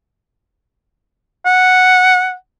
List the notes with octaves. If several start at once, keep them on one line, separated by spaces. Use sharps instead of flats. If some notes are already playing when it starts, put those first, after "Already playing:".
F#5